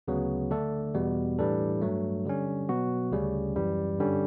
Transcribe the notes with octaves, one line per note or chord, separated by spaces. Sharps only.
D2 C#3 F#3 B3
D3 A3 D4 A4
E2 B2 G3 B3
A2 E3 G3 D4 A4
G2 F#3 A3
D3 G3 C#4
B2 F#3 B3 F#4
D2 C#3 G3 C#4
F#2 E3 G3
G2 D3 G3 C#4